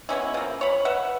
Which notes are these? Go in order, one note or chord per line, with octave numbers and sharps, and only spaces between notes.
G#3 B3 C#4 E4
F3 A#3
C#5 B5
B4 E5 F#5